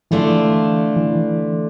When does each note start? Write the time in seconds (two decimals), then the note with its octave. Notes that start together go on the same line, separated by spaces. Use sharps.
0.11 D3 E3 A3 D4 F4
0.96 E3